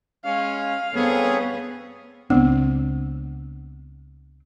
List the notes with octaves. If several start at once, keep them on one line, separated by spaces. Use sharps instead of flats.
G#3 C#4 F5
G2 B3 C4 G#4 A4 C#5
C#2 B3 C4 D4